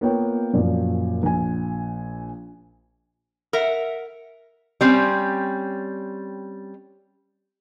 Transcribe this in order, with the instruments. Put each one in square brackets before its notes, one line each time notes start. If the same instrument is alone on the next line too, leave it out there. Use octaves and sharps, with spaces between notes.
[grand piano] A#3 B3 F4 C#5 G5
F#2 A#2 F3 D5
A#1 G#5
[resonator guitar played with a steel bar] A#4 E5 F#5
G3 C4 C#4